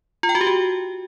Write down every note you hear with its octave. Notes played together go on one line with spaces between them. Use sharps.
F4
G5
F#4
G4
F#4